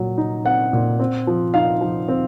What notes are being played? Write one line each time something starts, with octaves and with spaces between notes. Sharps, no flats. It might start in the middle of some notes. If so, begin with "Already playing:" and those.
Already playing: A#2 F#3
D#4
C4 F#5
A#2
C4
F3
D#4 F5
F3
C4